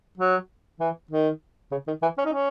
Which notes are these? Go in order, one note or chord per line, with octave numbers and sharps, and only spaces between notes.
F#3
E3
D#3
C#3
D#3
E3
C#4
D#4
C#4